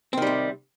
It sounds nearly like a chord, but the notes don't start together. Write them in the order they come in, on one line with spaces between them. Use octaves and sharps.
C4 D#3 G3 C3